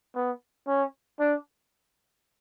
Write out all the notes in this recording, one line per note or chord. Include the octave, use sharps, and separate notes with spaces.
B3
C#4
D4